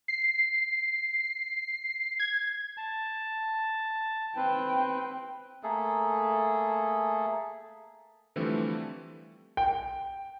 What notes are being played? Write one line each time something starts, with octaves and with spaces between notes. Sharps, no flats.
C7
G#6
A5
C4 B4 G5
A3 A#3 G#4 A4
D3 E3 F3 G3 A3 C4
G5